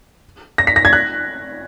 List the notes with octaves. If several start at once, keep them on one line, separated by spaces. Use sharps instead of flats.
A#6
B6
A#6
G#6
F#6